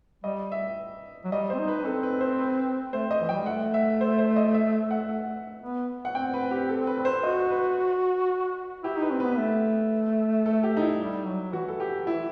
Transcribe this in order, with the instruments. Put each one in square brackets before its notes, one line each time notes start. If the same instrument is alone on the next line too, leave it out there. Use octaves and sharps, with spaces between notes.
[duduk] G3 [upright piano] D#5
[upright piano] E5
[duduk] F#3
[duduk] G3 [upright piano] D#5
[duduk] C4 [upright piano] C5
[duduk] D#4
[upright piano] B4
[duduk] C4 [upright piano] A4
[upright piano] B4
C5
B4
[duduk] A3 [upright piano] C5
[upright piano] D#5
[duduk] E3
[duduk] G3 [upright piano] G5
[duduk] A3 [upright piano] F#5
[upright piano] E5
C5
C5
D#5
E5
F#5
[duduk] B3
[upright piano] F#5
[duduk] C4 [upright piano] G5
[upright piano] B4
G4
A4
B4
B4
C5
[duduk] F#4 [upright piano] D#5
[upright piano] B4
[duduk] E4 [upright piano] G4
[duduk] D#4 [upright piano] B4
[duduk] C4
[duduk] B3 [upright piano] B4
[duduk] A3
[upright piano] A4
G4
D#4
E4
[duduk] G3
F#3
[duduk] E3 [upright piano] F#4
[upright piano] A4
G4
E4